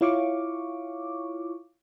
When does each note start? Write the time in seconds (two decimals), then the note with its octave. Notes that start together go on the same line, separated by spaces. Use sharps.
0.01 E4 F4 C#5 F5 C#6 D6